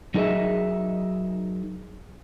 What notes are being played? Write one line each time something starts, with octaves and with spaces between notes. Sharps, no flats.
F#3 D#4 G#4 A#4 D#5 E5